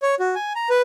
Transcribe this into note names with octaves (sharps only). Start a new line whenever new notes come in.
C#5
F#4
G#5
A#5
B4